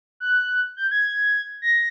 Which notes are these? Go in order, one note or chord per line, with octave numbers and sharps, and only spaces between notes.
F#6
G6
G#6
A#6